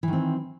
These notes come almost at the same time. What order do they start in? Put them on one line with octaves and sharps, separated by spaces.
E3 D#3 C4